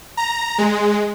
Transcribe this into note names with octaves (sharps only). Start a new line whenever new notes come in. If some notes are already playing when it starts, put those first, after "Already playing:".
A#5
G#3